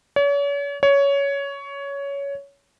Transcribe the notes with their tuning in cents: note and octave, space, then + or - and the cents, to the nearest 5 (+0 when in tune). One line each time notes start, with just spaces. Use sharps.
C#5 +40
C#5 +15